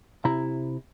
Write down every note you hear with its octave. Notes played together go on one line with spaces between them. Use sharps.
C3 E4 A#5